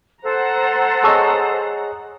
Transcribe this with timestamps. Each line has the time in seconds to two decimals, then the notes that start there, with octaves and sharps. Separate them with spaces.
0.22 A4 C5 F#5 A#5
1.04 G#4 C#5 D#5 A5 C#6 E6